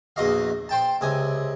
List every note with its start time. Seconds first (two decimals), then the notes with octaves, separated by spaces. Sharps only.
0.16 A#1 E2 F#4 D#5 F5
0.69 C5 G5 A5
1.01 C#2 C3 G#5 D#6